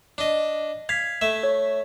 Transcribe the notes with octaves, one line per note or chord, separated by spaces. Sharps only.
D4 D#5
F5 G#6 B6
A3 E5
C#5